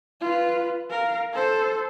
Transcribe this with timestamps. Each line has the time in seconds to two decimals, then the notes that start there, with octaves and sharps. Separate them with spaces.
0.21 F4 B4
0.90 A#4 F5
1.33 A4 C5